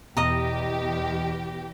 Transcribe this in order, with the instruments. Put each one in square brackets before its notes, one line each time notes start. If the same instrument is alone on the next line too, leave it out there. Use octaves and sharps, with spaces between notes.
[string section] E2 G4 [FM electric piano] B2 A#6 [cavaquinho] D#5 A#5